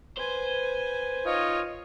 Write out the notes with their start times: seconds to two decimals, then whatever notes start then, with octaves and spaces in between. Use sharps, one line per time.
0.18 B4 C5 G#5
1.26 D#4 F4 C#5 D#5